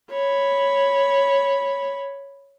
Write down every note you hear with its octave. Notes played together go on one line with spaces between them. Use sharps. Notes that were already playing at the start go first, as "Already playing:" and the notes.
C#5 B5